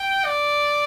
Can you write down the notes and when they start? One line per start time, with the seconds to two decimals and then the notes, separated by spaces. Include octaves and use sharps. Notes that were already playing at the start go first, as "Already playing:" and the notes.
Already playing: G5
0.25 D5